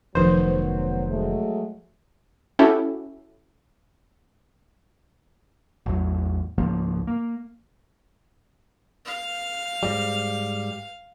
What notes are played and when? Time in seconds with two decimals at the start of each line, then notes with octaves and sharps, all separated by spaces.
0.15 F1 D#3 F3 F#3 B3 C5
1.08 F#3 G#3 A3
2.59 C#4 E4 F#4 G4 A4
5.86 A1 E2 F#3
6.58 C#2 G#2 F3 A#3
7.07 A#3
9.05 F5
9.83 G#2 G3